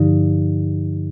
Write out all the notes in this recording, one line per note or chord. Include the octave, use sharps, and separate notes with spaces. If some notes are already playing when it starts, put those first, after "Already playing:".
Already playing: G2 D3 F3 D#4